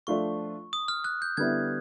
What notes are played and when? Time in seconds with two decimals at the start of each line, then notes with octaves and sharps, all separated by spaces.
0.07 F3 A3 D4 F4 C#6
0.73 D#6
0.88 F6
1.04 F#6
1.22 G6
1.37 D3 G3 B3 E4 G#6